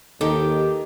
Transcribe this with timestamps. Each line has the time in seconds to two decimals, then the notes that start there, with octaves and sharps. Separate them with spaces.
0.21 D#2 D#3 D#4 G4 A4